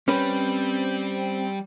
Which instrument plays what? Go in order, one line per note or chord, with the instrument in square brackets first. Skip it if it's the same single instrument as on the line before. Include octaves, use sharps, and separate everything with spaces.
[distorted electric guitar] G3 [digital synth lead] C4 [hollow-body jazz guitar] C#4 B4